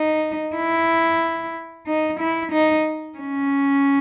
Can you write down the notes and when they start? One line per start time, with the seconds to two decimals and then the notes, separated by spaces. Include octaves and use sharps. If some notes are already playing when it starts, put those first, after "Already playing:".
Already playing: D#4
0.55 E4
1.87 D#4
2.20 E4
2.52 D#4
3.18 C#4